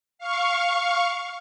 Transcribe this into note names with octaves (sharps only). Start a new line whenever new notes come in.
F5 C#6